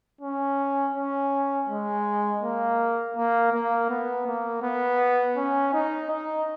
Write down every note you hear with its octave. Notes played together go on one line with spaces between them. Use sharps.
C#4
C#4
G#3
A#3
A#3
A#3
B3
A#3
B3
C#4
D#4
D#4